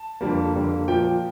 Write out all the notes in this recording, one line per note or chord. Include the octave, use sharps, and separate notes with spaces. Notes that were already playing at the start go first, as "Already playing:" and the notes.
Already playing: A5
F2 D3 G3 A#3
F2 D3 G3 A#3
A#2 F3 A#3 G5